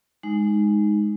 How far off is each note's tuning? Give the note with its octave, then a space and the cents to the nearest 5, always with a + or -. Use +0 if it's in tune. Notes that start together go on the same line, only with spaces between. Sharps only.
G#3 +0 D#4 +0